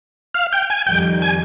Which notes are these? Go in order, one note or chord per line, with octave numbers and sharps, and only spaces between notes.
F5
G5
G#5
F2 D#3 G3 G5
G#5